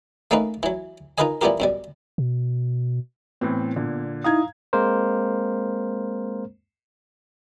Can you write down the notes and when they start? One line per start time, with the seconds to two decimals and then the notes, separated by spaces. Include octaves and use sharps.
0.31 A3 A#3 C#4 D#4 B4
0.63 E3 F#3
1.18 D#4 F4 A#4 B4 D#5 G#5
1.41 E3 G3 B3 F4 G4 A#4
1.60 F#2 B2 G3
2.18 B2
3.41 A2 E3 B3 C4
3.76 A#2 D3
4.24 D#4 E4 F5 A#5 D#6 G#6
4.73 G#3 A#3 C4 A#4 C5